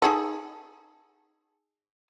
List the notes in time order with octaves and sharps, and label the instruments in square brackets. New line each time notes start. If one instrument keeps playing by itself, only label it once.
[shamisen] D#4 G#4 A4